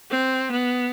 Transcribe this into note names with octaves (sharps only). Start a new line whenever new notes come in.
C4
B3